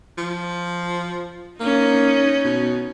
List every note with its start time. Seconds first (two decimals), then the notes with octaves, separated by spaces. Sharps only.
0.18 F3
1.60 A#3 C#4 D#4
2.45 B2